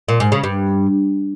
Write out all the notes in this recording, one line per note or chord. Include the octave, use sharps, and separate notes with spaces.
A#2
G#2
C#3
G2